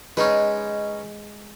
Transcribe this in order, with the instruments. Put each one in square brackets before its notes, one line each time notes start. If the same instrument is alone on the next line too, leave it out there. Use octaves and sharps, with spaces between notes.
[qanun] G#3 [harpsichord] C#4 D#4 B4